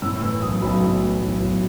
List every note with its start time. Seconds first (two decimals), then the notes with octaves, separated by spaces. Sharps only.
0.02 A2 E6
0.22 E3 E6
0.42 B1 D#6
0.62 B1 B5
0.82 A2
1.01 E3
1.21 B1
1.41 B1